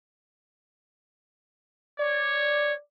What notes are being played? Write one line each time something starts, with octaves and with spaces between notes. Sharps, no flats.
C#5 D5